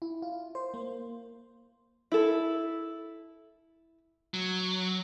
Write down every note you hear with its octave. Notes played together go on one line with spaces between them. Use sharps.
E4
F4
C5
A#3
E4 A4
F#3